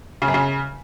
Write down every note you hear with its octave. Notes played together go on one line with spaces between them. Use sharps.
C#3
F#2
C#3